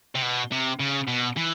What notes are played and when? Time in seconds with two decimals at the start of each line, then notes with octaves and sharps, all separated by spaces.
0.15 C3
0.22 B2
0.51 C3
0.79 C#3
1.07 B2
1.36 E3